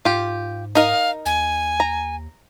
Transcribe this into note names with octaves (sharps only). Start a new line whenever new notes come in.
G#2 F4 G4
D#4 A#4 D#5 F5
D#2 G#5
A#5